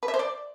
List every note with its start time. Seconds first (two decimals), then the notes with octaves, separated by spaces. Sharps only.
0.03 B4
0.08 E5
0.14 C5
0.19 D5